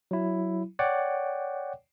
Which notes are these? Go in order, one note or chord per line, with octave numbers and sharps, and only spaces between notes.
F#3 E4
C#5 D5 F#5 G5